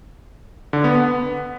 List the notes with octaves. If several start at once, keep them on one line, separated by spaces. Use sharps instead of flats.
D3
B3
B3